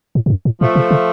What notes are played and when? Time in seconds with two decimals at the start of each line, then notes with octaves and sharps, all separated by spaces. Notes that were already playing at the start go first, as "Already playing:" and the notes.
0.15 A2
0.26 A2
0.30 F#2
0.45 A2
0.61 A#2 F3 A3
0.76 C3
0.91 C#3